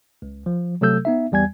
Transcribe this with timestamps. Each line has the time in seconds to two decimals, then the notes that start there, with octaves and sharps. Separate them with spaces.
0.22 C#2
0.46 F3
0.81 C3 F#3 A3 A4 E6 G6
1.05 B3 D#4 E5
1.31 A#1 E2 G3 G#5 G#6